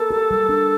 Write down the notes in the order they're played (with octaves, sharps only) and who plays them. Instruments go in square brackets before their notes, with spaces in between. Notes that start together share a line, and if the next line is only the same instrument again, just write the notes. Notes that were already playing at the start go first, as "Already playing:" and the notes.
Already playing: [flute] A4 [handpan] A#4
[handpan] G4
G3
D4